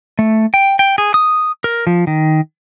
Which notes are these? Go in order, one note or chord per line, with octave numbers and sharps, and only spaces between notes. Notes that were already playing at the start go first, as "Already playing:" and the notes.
A3
G5
G5
G#4
D#6
A#4
F3
D#3